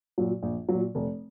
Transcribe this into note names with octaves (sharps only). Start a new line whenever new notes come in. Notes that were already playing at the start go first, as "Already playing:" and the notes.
A#2 F#3
A#1
A#2 F#3
F1